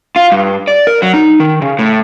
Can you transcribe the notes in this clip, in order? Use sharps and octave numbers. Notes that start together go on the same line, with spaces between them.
F4
G2
D5
A#4
F#3
D#4
D#3
C#3
A2